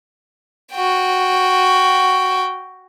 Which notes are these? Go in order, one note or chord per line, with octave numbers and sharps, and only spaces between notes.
F#4 G5